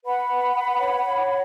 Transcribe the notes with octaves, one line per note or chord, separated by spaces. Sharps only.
B4 F#5 B5
B4
B4
C#5
C#5